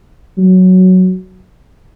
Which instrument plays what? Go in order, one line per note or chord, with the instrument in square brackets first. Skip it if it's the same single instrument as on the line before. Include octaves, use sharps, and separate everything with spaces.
[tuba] F#3